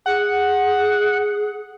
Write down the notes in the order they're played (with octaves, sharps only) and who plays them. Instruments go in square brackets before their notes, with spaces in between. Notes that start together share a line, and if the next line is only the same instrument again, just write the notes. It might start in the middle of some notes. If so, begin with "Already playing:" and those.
[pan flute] G#4 [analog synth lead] F#5